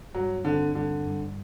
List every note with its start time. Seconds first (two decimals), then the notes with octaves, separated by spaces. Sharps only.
0.14 G2 F#3
0.45 D3 C4
0.75 G2 D3
1.07 G2